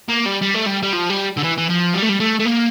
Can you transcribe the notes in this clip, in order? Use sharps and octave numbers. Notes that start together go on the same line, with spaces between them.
A#3
G3
G3
A3
G3
G3
F3
G3
D3
E3
E3
F3
G3
A3
G3
A3
A3
A#3